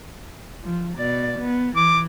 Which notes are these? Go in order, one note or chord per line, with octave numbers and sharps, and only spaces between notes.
F3
B2 D5
B3
E3 D6